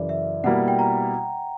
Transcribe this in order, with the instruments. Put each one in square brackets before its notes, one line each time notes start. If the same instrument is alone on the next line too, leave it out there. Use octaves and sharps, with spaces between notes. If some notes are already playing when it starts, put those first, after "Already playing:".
Already playing: [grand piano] F#2 C#3 E3 [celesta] D5
[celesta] E5
[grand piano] B2 G3 A#3 E4 [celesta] F#5
[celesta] G5
A#5